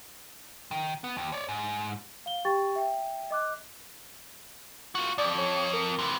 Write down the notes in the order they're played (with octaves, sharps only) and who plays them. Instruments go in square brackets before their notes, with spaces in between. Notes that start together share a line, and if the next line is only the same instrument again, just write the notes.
[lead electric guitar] D#3
B3
D#2
C#5 D5
G#2
[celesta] F5 G7
G4 G5 C#6 A6
E5 G5
D#5 D6 F#6
[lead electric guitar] F4 F#4
[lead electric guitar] F2 [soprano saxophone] D5
[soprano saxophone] C#5
A#4
[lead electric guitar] C3 E3